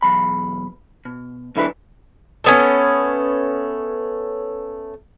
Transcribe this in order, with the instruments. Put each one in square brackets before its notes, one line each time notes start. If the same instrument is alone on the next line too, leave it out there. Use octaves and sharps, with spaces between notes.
[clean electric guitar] B1 E2 B5
B2
B1 D3 E4 A#4 B4
[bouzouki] A3 B3 C#4